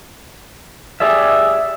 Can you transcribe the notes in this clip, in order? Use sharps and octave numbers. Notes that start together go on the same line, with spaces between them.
G4 G#4 D5 E5